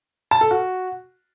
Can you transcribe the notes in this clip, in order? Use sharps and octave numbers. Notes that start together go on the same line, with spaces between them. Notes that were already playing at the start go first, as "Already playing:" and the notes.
A5
A4
F#4